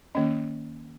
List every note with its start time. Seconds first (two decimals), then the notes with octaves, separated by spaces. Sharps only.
0.15 D#3 A#3 C#4 D#5